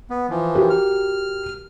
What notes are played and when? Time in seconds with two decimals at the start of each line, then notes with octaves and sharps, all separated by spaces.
0.10 B3
0.30 E3 F3
0.55 F#4 G4 A#4
0.70 F6